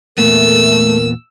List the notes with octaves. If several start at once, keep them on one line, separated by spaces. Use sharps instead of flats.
E2 A#2 A3 B3 A#4 E6